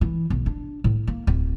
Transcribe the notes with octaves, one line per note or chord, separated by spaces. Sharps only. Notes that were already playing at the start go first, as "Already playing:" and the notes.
E3
B1
D4
A2
A#3
D1